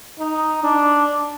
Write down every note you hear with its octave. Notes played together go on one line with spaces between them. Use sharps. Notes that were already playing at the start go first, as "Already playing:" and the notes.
D#4
D4